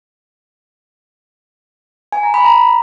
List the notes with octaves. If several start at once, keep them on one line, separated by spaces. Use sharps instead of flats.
G#5
A#5
B5
A#5